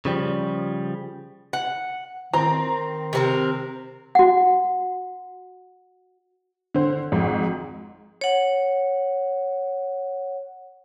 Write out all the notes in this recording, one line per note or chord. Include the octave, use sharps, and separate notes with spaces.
C#3 F3 G3
F#5
D#3 C4 A#5
C3 C4 A#4
F#4 F#5
D3 C5
G#1 F2 G#2
C#5 F#5